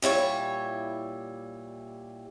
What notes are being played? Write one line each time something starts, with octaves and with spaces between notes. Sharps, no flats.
A#2 G3 E4 C#5